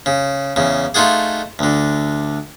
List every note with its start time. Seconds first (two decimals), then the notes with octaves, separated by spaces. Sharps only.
0.06 C#3
0.56 E2 C#3
0.94 A3 D#4 F4 F#4 G#4
1.59 D2 D3